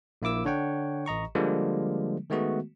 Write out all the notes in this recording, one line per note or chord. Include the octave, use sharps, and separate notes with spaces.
A#1 A#3 E4 D6 E6
D3 D4 C#5 F#5 G5
A1 D#5 A#5 C#6
D3 F3 G3 G#3 A#3
D#3 G#3 A3 B3 F#4